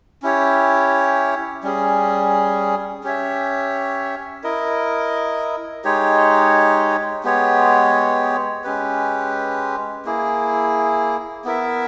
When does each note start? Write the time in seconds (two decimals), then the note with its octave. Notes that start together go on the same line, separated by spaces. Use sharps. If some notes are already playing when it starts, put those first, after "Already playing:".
0.22 C#4 E4 G4 C#5
1.63 G3 C#4 G#4
3.03 C#4 G4 C#5 E5
4.44 E4 A#4 D#5
5.84 G#3 D#4 G4 C#5
7.24 G#3 B3 G4 C#5
8.64 G#3 C#4 G4 B4
10.05 A#3 E4 G#4
11.45 B3 E4 A#4 E5